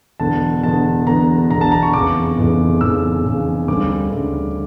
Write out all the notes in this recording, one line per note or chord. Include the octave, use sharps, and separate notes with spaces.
E1 E2 D3 A5
E1 E2 D3 A5
E1 E2 D3 A#5
E1 E2 D3 A#5
A5
A#5
C#6
F1 E2 C#3 D6
F1 E2 C#3
F1 E2 C#3 E6
F1 E2 C#3
D2 C#3 G3 D6
D2 C#3 G3